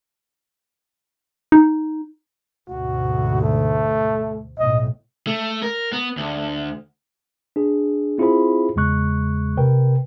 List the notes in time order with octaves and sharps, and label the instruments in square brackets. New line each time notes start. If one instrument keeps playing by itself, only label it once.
[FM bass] D#4
[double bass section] D2 G#2 B2 [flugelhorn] F#4
[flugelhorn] A3
[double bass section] B1 A2 [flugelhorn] D#5
[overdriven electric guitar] A3
A#4
B3
D2
[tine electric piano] D4 G#4
C4 E4 F4 G#4 C5 B5
E2 C#3 G#3 C#6 F#6
C3 A#4 B4 G5